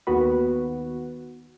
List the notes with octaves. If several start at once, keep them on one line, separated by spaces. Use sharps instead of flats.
D#2 B3 F#4 B4